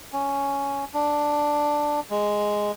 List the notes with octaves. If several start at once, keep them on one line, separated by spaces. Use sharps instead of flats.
C#4
D4
G#3